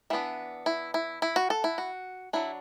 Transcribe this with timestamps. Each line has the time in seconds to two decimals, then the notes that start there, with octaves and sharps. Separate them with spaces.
0.10 E3 B3 D4 E5
0.66 E4
0.94 E4
1.22 E4
1.36 F#4
1.50 A4
1.64 E4
1.78 F#4
2.33 F#3 D4 E4